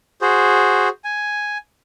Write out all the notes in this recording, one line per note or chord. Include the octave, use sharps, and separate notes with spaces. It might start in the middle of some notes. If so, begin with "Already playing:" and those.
F#4 G#4 C5
G#5